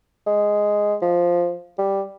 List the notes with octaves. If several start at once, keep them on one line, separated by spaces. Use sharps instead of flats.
G#3
F3
G3